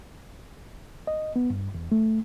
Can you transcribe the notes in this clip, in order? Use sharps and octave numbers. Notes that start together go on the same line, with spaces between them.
D#5
B3
G2
E2
A3